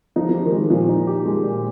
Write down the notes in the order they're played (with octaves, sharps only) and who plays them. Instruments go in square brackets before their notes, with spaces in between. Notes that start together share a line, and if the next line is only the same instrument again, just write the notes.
[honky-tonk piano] F3 [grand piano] D#4
[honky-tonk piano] F3
[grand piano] G4
[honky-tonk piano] D#3
[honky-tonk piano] F3 [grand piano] G#3
[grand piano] A#2 [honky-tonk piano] F3
[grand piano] D#4
G4
G#3
A#2